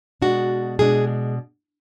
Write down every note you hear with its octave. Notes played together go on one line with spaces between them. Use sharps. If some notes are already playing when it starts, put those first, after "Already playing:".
B2 G#3 D4 F#4
B2 G#3 D4 G#4